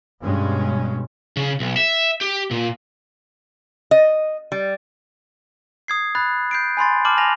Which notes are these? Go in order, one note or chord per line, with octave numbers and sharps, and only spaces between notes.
G2 B2 G#3 C#4
C#3
B1
E5
G4
A#2
D#5
G3
D#6 G#6 C7
B5 D#6 F#6 A6
G6 C7 D7
G#5 B5 C6 A6
A5 D6 F6 F#7
G#5 A5 D6 A#6 F7